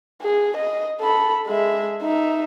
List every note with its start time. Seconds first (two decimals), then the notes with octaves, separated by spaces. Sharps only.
0.22 G#4
0.57 D#5
1.01 A4 B5
1.47 G#3 E5
2.02 D#4 E5